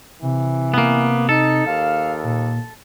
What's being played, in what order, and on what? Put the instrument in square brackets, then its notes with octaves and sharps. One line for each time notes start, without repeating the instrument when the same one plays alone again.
[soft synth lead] C3 [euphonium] E3
[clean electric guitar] A#3 B3
[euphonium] D#4 [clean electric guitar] A4
[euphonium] D#2 [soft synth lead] F5
[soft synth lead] A#2